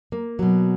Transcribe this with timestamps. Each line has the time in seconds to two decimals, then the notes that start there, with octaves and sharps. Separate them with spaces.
0.12 A#3
0.39 B2 F#3